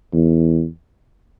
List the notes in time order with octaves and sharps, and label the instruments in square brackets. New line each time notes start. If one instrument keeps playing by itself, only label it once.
[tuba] E2